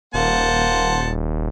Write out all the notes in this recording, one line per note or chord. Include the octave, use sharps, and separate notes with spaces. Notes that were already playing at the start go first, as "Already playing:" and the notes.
D#1 A#3 C5 F#5 A5